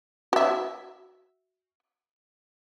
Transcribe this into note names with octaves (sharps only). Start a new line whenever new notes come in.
F#4 E5